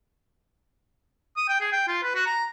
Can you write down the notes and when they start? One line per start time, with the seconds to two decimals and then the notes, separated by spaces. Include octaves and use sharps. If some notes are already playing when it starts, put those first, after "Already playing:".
1.37 D#6
1.49 G5
1.61 G#4
1.72 G5
1.88 F4
2.03 B4
2.15 F#4
2.26 A#5